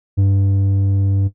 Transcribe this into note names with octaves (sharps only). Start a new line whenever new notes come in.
G2